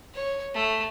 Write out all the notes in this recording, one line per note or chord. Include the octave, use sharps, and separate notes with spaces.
C#5
A3